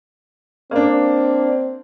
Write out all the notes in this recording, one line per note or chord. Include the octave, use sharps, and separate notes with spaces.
A#3 C4 D4